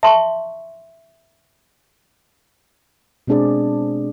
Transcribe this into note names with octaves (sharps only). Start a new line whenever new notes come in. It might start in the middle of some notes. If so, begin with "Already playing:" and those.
E5 A5 C6 C#6
B2 G#3 C4 D4 G#4 D5